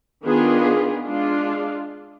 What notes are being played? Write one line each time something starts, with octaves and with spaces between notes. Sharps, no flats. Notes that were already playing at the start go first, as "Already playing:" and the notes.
D#3 B3 D4 F4 G#4
G#3 D4 F4